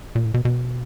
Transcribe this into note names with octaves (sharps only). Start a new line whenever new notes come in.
A#2
A2
B2
B2